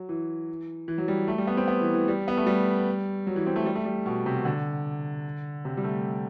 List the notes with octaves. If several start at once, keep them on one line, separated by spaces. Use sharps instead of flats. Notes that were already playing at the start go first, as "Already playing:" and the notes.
Already playing: F#3
E3
E3
F#3
G3
A3
G3
B3
C4
B3
E3
E3
G3
B3
A3
G3
F#3
E3
C4
A3
G3
A3
G3
B2
C3
B2
D3
C3
G3
A3